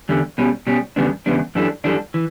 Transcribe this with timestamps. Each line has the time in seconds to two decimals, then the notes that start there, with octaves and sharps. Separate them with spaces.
0.09 E2 D3 G3
0.38 B2 G3 C#4
0.67 B2 G3 C#4
0.96 E2 C#3 G3 B3 D4
1.26 E2 C#3 G3 B3 D4
1.55 F#2 E3 G3 D4 A4
1.84 F#2 E3 G3 D4 A4
2.14 E3